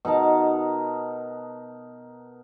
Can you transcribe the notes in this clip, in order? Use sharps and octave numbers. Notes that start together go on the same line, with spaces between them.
B2 D#4 A#4 A5